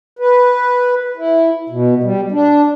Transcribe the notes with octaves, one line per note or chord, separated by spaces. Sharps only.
B4
E4
B2
G3
D4